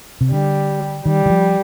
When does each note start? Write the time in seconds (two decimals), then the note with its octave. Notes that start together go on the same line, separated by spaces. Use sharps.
0.21 C3
0.31 D3 G3
1.05 D#3 G3
1.26 D#3
1.30 F3